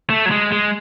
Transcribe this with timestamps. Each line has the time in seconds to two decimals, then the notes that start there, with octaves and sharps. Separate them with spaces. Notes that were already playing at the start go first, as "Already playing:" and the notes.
0.10 A3
0.26 F#3
0.31 G#3
0.52 G#3